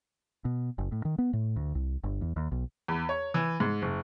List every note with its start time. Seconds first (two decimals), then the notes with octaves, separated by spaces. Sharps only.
0.45 B2
0.78 F#1
0.92 A2
1.05 D#3
1.18 B3
1.33 A2
1.56 D2
1.75 C2
2.04 G1
2.21 E2
2.36 D#2
2.52 B1
2.88 E2
3.09 C#5
3.34 E3
3.60 G#2
3.82 F#1